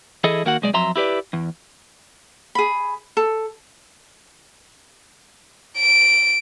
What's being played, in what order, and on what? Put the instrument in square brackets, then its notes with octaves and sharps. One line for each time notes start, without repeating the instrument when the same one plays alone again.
[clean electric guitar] E3 E4 G#4 A4 D#5
D#2 A#3 F#4 F#5
B1 G#3 D5
F2 F#3 E5 A#5 C6
E4 G4 B4 D5
E2
[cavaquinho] G#4 B5
A4
[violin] D7